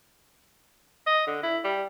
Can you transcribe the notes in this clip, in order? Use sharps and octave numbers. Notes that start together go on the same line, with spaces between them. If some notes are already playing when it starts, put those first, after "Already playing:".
D#5
D3
E4
G3